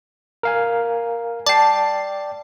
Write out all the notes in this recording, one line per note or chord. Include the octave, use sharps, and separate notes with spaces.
A#4 F5 G#5
D5 G5 A5 C7